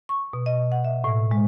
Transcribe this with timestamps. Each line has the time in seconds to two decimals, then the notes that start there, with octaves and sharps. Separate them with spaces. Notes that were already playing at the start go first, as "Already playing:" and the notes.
0.09 C#6
0.33 B2
0.46 D#5
0.72 F#5
0.85 E5
1.04 A2
1.31 G#3